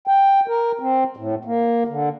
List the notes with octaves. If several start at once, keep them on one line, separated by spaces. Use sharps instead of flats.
G5
A#4
C4
A2
A#3
D3